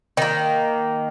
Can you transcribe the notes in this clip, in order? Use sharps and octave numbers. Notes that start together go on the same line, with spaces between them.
D#3 A#3